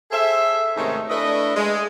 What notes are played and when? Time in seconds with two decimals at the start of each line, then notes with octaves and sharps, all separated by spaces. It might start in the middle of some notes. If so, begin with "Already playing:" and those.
0.12 G#4 A4 C5 E5
0.76 G#2 C3 D#3 A3 C#4 D#4
1.09 A3 D4 E4 B4 D#5
1.56 G#3